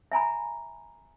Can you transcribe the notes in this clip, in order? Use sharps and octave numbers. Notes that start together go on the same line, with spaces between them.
E5 G#5 A#5 B5